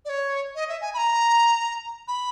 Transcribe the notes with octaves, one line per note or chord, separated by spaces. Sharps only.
D5
C#5
D#5
E5
G#5
B5
A#5
B5